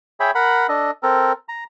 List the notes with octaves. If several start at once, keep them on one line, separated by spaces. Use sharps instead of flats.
G#4 C#5 E5 G5 B5
A#4 F#5 B5
D4 A4 D#5
C4 A4 A#4
A#5